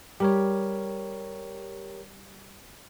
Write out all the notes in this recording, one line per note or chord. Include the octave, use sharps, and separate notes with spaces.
G3 G4 A#4 C#5